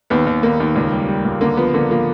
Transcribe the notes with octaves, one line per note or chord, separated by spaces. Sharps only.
D#2 B3
D#2
D#2 A#3
D#2
C#2
G3
G3
C#2
D3 A#3
F3 B3
D3 A#3
F3 A#3